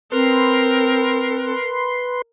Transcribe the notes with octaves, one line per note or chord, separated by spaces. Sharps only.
C4 A#4 B4 C6